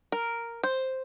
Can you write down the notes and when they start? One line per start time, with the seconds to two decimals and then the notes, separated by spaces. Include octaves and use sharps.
0.12 A#4
0.64 C5